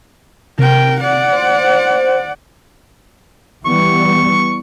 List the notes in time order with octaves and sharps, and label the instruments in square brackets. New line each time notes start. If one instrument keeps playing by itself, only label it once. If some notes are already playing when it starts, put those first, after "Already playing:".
[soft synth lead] C3 [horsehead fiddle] A#4 G5
[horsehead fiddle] D5 F#5
[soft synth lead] C5
[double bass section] E3 G3 B3 [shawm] C#6